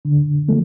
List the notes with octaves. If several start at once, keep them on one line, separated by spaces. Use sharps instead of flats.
D3
F3 A3